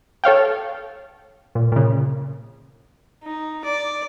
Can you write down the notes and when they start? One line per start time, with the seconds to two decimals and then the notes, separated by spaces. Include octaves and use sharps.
0.24 A4 C#5 F5 G5
1.55 A#2
1.72 A#2 C#3
3.23 D#4
3.65 D5